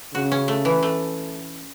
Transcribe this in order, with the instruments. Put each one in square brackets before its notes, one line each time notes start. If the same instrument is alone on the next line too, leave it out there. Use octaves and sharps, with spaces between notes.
[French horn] C#3 [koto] F#4
[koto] C#4
A3
E3
A3